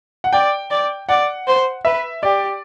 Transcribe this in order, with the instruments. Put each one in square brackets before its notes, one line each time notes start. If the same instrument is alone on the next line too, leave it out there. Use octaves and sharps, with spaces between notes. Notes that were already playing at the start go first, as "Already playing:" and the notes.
[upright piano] F#5
[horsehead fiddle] D5 [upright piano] G5
[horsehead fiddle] D5
[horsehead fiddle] D5 [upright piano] F#5
[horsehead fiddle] C5
[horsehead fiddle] B4 [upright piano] E5
[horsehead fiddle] G4 [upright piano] D5